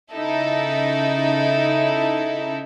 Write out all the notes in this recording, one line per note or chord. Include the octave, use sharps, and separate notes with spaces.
C#3 D#4 E4 A4